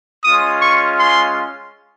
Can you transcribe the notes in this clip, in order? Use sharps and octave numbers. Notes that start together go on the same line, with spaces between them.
G#3 C#4 F4 D#6
C#6
C6